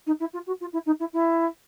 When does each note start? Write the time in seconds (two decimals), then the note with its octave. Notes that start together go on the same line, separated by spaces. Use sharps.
0.06 D#4
0.20 E4
0.33 F4
0.47 F#4
0.61 F4
0.73 E4
0.86 D#4
1.00 E4
1.13 E4